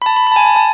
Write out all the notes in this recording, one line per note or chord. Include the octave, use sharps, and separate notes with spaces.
B5
A5
B5
B5
A5
G#5
A5
A5